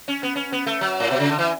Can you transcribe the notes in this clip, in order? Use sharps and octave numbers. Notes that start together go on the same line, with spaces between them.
C#4
B3
C#4
B3
A3
F#3
A2
B2
C#3
D3
E3